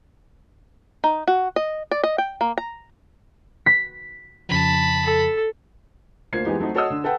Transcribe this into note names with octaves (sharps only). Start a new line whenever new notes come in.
D#4
F#4
D#5
D5
D#5
G5
A#3
A#5
B6
F2 C#3 F3 A5 B5
A4
D2 A#3 F4 C5 G#6 C7
E3 G#3 B3 D#4 G4
F#3 A3 C4 D#4
F#4 A4 C#5 D#5 D#6 E6
D3
A4 B4 F#5 G5